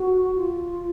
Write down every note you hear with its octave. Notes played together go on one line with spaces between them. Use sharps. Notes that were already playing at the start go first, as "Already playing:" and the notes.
Already playing: F#4
F4